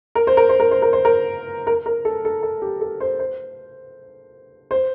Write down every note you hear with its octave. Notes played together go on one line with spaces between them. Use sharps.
A#4
C5
A#4
C5
A#4
C5
A#4
C5
A#4
A#4
A#4
A4
A4
A4
G4
A4
C5
C5
C5